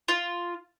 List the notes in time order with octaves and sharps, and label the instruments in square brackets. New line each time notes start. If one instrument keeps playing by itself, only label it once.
[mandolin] F4